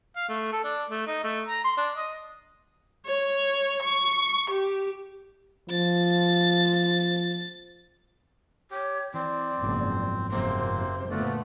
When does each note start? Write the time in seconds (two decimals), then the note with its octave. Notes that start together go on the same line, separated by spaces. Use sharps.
0.16 F5
0.28 A3
0.52 A4
0.64 D4
0.90 A3
1.07 D#4
1.24 A3
1.48 A#5
1.64 C6
1.77 D4
1.96 D#5
3.06 C#5
3.82 C#6
4.50 G4
5.70 F3 A6
8.71 G4 C#5
9.14 E3 C4 D5
9.62 F#1 G#2 B2 F3
10.31 F#1 C3 A#3 C4 C5
11.11 A#2 D3 A3 B3 F4 F#4 D5